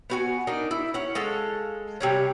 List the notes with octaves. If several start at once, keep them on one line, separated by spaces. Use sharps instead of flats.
B3 F#4 G#5
D4 D#4 A#4
E4
C#4 F#5
G#3 A4 F5
C3 G3 C#4